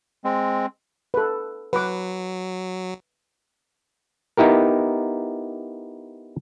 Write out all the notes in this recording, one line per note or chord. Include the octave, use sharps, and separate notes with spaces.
G#3 C4
A4 B4
F#3 B4 D6
B3 D#4 E4 G4 A#4